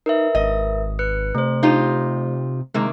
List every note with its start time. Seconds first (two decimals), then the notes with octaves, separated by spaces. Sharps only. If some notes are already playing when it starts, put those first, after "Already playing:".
0.06 D#4 A#4 B4 E5
0.35 G#1 D#5
0.99 B4 F#6 C#7
1.35 C3 A3 C5
1.63 D#4 F4 G4
2.74 C3 D#3 G#3 A#3